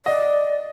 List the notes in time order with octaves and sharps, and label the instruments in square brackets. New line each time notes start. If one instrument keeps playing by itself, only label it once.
[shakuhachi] D5 [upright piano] D#5